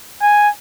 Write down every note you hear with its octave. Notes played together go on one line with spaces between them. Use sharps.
G#5